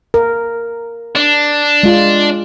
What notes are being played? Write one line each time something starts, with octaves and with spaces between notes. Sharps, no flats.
A#4
D4
G#3 F4